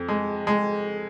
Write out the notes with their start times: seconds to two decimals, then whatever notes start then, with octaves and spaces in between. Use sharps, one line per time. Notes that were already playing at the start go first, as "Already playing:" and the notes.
Already playing: F2
0.08 G#3
0.47 G#3